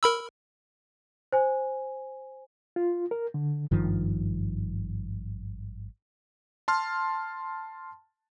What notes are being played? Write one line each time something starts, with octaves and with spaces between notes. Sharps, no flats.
A#4 B5 E6
C5 G#5
F4
A#4
D3
G#1 G2 D#3 F3
A5 C6 F6